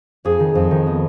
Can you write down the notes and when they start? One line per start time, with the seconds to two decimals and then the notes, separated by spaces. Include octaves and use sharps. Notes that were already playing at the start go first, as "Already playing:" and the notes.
0.25 F2 G#4
0.40 D#3
0.55 F2
0.71 D#3
0.87 B3